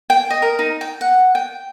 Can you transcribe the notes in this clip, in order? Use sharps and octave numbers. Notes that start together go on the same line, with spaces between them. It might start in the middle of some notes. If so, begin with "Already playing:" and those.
G5
D#5
A#4
D#4
G5
F#5
G5